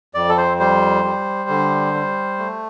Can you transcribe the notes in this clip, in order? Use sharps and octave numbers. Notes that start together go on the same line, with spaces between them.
F2 D5
A4
C5
G3 C5
G3
D3
G3
A3